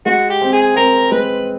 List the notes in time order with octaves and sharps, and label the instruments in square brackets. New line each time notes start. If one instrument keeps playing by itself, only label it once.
[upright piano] G#3 [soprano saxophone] F#4
[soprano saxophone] G4
[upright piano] C4
[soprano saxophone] G#4
[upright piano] C4 [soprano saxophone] A#4
[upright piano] G#3 [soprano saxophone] B4